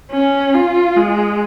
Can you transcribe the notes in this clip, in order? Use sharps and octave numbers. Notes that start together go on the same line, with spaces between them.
C#4
F4
G#3